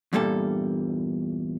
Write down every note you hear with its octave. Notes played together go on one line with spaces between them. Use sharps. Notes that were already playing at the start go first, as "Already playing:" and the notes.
E2 G2 A#2 G3 A4